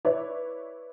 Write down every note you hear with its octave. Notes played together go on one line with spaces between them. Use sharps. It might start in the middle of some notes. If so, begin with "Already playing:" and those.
E4 B4 C#5 D5